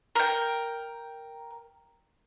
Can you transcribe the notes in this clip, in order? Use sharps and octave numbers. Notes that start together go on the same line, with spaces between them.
A#4 G5